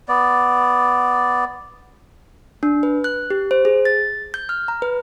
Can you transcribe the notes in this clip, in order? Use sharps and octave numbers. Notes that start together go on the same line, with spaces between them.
B3 D5
D4
B4
F#6
G4
C5
G#4
A6
G6
F6
A#5
B4